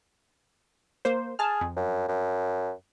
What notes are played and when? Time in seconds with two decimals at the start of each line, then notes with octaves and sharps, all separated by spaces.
1.05 A#3 C5
1.39 G#4 A5 F6
1.61 F2
1.76 F#2
2.08 F#2